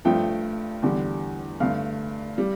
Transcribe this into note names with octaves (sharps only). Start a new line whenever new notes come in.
G2 F3 A3 G5
E2 D3 G3
G2 D3 A3 F5
G3